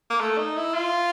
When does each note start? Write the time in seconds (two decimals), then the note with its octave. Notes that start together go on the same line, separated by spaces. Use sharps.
0.10 A#3
0.20 A3
0.38 D#4
0.57 E4
0.74 F4